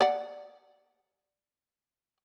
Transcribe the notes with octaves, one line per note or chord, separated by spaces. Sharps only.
D5 F#5